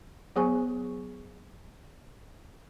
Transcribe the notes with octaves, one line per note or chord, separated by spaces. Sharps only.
F#3 B3 G#4 C5 G#5 C#6